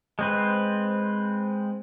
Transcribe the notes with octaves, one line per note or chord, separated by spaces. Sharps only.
G#3 C4 B4